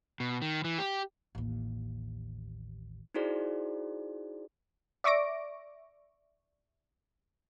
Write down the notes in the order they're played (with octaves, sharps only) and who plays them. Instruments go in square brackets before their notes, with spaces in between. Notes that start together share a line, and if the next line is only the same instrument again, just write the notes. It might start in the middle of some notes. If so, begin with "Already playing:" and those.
[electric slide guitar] B2
D#3
E3
G4
[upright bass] A1 D#2
[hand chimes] D#4 E4 F#4 G#4 C5 D5
[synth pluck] D5 E5 C#6 D6 A#6 D7